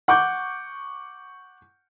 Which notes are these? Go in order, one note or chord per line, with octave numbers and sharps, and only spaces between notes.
F#5 C#6 D6 G6